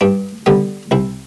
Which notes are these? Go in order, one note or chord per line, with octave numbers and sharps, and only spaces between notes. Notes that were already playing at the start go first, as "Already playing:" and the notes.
G2 D4
D3 G3 B3
C2 E4